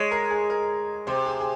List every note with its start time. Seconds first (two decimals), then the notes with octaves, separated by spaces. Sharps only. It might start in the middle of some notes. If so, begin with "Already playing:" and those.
Already playing: G#3 C#5
0.11 A#4
0.31 G#4
0.50 A#4
1.07 C3 C5
1.26 G#4
1.40 G#4